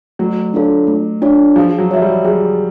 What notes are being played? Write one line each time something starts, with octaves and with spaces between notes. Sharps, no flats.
F#3 A3
D4 F4 A4 C#5
A3
D4 F4 A4 C#5
F3 G#4
F#3
F#3 C#5 E5
G3
F#3 G#4